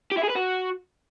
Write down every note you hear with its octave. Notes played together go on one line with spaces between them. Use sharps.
G4
E4
G#4
B4
F#4